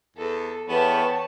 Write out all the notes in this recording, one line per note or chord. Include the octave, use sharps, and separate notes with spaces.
E2 A4
E2 B3 B4 C#5 G5 A5